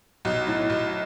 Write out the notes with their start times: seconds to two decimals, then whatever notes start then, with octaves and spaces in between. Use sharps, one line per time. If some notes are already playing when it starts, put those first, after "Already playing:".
0.25 B1
0.47 A2
0.70 B1